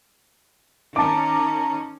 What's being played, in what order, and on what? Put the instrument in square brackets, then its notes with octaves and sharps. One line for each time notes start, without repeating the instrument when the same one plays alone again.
[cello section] D#3 C#4 [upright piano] A5 D6 [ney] A#5